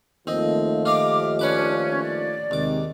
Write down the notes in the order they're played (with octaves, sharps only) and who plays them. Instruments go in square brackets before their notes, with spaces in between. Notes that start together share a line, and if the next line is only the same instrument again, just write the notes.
[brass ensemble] D#2 F3 A3 [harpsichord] C4 D#5
[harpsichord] F4 D#5 F5 [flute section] D6
[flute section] C#4 [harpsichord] D4 B4 D6
[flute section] D5
[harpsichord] D#2 D6 [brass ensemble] C3 D#3 G#3